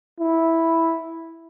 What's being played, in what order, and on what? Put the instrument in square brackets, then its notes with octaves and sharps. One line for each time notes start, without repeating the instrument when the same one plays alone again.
[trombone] E4